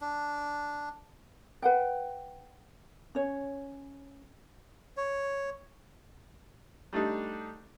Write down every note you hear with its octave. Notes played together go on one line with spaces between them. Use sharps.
D4
B4 F#5 G5
C#4 C#5
C#5
G3 A3 D4 D#4